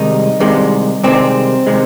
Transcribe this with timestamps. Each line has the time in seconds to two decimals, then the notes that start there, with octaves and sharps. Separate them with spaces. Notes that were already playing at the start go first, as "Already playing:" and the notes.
Already playing: C2 C3 D#3 G#3 D#4
0.40 C2 C3 D#3 G#3
1.03 C2 C3 D#3 G#3 C4
1.67 C3 D#3 G#3